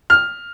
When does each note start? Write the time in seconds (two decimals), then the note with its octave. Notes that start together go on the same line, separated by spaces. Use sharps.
0.10 F6